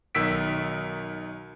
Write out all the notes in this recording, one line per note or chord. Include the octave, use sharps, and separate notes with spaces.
B1 D#3 E6 B6 D7